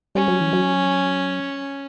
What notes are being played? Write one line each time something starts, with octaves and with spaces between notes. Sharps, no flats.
G3 C#4
F#3
E3
F#3